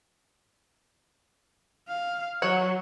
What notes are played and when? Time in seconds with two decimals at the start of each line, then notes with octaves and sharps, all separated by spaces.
1.88 F5
2.42 F#3 F#4 C#5 F#5